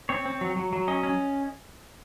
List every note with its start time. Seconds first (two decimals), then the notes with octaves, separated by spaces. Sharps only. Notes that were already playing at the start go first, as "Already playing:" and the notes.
0.09 C4 C#5
0.26 C4
0.41 F#3
0.56 F#3
0.73 F#3
0.88 C#4 D#5
1.03 C#4